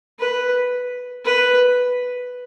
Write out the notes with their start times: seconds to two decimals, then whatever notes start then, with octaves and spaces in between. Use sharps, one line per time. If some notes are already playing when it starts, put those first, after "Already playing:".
0.20 B4
1.25 B4